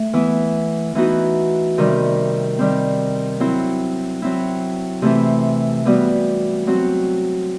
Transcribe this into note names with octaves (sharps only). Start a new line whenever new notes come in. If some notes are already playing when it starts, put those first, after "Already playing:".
Already playing: A3
E3 B3 E4
E3 B3 D#4 F#4
C3 D#3 G3
D#3 G3 C4
F#3 C4 E4
F#3 C4 E4
C3 E3 A3 C4 E4
E3 G3 B3 F#4
F#3 C4 F#4